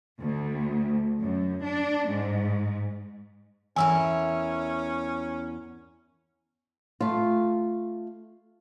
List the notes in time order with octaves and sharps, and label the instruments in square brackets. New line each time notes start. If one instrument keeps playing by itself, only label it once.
[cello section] D2
F#2
D4
G#2
[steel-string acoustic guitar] E2 E4 A#4 [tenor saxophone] C#4 [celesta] G#5 E6
[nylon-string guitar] A3 F4